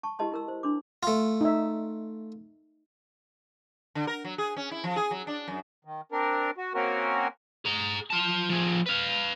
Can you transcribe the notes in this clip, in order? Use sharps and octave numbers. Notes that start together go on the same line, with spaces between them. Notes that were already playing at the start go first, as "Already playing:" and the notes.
A5 C#6
E4 G4 B4 D#5 A5 C6
E4 A#4 E6
C5
D4 C6 D6
A3 F4
D#4 E5
D3
A#4
F#3
G#4
C#4
E4
F3
G#4
F#3
D4
F#2
D#3
C4 D4 A#4
F#4
A#3 C4 C#4 F#4 A#4
G#4 A#5
F4 A5
F3 G#4
B4 F5